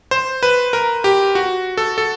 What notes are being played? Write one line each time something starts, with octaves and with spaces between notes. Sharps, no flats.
C5
B4
A#4
G4
F#4
A4
A4